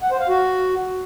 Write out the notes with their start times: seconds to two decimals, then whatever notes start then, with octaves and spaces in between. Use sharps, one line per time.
0.02 F#5
0.11 C5
0.20 F5
0.29 F#4